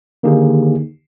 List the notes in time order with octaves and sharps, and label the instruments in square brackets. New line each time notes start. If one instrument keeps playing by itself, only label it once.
[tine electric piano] D3 D#3 A#3 D#4 G4 G#4